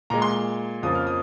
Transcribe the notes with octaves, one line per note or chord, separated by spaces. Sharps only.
A#2 G#3 A#5
C6
F2 C#3 F3 A#3 D#6
F6
D#6